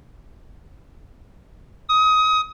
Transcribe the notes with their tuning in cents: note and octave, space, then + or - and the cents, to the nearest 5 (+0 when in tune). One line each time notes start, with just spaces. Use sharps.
D#6 +25